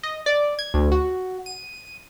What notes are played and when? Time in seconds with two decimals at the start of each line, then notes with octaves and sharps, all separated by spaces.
0.03 D#5
0.26 D5
0.59 G#6
0.74 D2
0.92 F#4
1.46 D#7